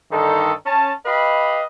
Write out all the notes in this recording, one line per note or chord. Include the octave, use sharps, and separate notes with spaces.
G2 D3 D#3 D#4 A4
C#4 A5
G4 B4 D#5 F5 B5